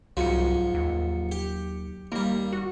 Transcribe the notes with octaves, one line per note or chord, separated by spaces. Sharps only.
C2 G#2 F3 F#3 C#7
D#2
G4
D#2 G3 A#3
F#4